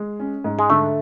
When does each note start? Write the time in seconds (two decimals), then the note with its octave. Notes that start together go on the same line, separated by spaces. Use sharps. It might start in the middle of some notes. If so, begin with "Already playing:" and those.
Already playing: G#3
0.20 C#4
0.44 G#2
0.59 G#3
0.69 D3 A3